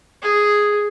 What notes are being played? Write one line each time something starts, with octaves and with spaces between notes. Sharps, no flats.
G#4